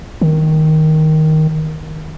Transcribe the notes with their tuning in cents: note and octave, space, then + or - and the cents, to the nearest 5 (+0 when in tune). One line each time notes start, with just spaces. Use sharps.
D#3 +5